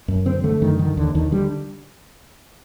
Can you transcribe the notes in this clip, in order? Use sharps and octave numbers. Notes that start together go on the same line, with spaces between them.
F#2
D3 C4
D3 A3
F#2 D#3
D3 D#3
D#2 D3
D#2 D#3
D3 G3